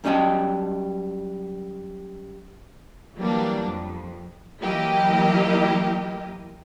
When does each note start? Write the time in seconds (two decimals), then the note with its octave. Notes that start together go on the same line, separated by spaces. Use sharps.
0.04 F#2 G3 C#4 D#5 G5 A5
3.17 E3 F#3 G3 A#3 D4
3.63 F2
4.60 E3 F#3 A#3 E4 G4 D#5